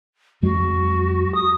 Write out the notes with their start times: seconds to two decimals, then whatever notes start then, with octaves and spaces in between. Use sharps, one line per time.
0.43 F2 F#3 G#3 F#4
1.34 D#6